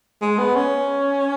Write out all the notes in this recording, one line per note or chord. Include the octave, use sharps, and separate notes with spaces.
G#3
B3
C#4